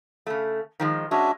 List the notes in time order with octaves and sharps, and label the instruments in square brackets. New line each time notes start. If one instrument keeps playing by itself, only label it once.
[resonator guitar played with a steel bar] C#3 A3
D#3 F3 G#3
[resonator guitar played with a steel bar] G#3 C#4 [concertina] D4 F#4 E5